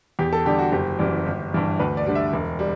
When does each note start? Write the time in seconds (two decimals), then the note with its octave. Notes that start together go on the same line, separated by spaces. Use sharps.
0.19 E2 G4
0.33 A4
0.45 D3 G3 G4
0.59 F#4
0.72 F#1 G4
0.99 F#2 E3 G3
1.26 G1
1.52 G2 E3 G3
1.80 D2 B4
1.97 D5
2.06 D3 G3
2.15 E5
2.33 E1
2.59 G3